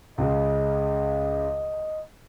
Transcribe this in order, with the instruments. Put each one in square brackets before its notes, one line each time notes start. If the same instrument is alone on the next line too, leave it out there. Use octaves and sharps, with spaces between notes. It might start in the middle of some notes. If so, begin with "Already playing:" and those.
[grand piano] C#2 C#3 [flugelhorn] D#5